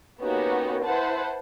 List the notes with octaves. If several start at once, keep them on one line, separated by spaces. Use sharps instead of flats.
A#3 B3 C#4 D#4 F#4 G4
E4 B4 C5 F#5 A5